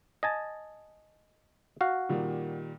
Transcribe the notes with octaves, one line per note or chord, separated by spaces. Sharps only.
D#5 G#5 A5
F#4 F5
A#2 D#3 G3